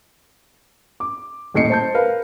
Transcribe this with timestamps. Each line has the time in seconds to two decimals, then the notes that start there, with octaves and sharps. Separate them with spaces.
1.00 D6
1.54 D#1 A2 D#5 C7 C#7
1.70 C5 A5 G6
1.94 A#4 B4 F5